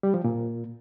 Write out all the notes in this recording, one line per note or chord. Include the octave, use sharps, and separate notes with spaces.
G3
F3
A#2